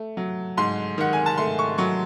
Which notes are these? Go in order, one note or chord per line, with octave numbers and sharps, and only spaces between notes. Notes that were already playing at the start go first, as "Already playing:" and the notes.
Already playing: A3
F#3
G#2 C6
D#3 F#5
G#5
A5
A3 C6
C#6
F#3 C#6